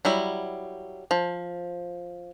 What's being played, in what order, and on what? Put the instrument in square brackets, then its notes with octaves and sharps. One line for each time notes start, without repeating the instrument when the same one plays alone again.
[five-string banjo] F#3 G3 E4
F3